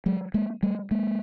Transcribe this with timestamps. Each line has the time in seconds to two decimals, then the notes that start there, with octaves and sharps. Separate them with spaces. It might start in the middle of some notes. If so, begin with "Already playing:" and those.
0.06 F#3 G#3
0.34 G#3 A#3
0.63 G3 A3
0.91 G#3 A#3